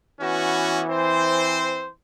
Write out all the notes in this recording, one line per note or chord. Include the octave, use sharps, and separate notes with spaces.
E3 B3 C#4 F#4
C4 C5